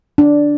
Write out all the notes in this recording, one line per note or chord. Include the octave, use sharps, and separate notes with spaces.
D4